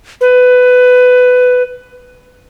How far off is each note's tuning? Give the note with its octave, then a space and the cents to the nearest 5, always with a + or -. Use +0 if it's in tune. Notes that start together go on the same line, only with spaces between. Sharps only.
B4 +15